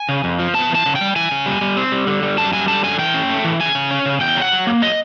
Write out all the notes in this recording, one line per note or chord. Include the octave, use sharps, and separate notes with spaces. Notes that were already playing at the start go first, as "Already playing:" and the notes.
Already playing: G#5
C#3
F2
F3
B3 A5
E3
A5
C#3
G5
G3
E3 G#5
C#3
G3
G3
C4
G3
D3
G3
F#2 A5
G3 G#5
D3 A5
F#2 G#5
E3 G5
C#4
A3
E3
C#3 G#5
C#3
C#4
C#3
E2 G5
F#3
F#5
F#3
A#3
F#3 D#5